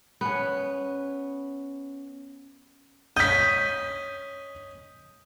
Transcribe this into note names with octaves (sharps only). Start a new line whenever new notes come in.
B3 C#4
C#4 D#5 G6 B6